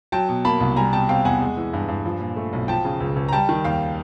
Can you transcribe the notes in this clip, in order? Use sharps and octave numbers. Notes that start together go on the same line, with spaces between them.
F#3 G5 A5
B2
A#3 A5 B5
C2
G3 G#5 A#5
B2 G5 A5
C4 F5 G5
E2 F#5 G#5
G#3
E3
G2
G2
F3
A#2
A3
B1
F3 G5 A5
C#3
C#2
C#2
A#5
G3 G5 A5
D#3
D#2 F5 G5